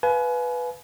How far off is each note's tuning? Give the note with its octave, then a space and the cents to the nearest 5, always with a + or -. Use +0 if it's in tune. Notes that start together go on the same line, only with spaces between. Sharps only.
B4 +0 F5 +0 G#5 +35